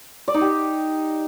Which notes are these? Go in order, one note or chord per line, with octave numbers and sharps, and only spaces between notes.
D5
D#4
G4